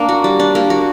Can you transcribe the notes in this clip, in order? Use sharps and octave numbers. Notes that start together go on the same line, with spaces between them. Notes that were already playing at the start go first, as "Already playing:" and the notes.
Already playing: A#3 D4
F#4
G3
D4
A#3
F#4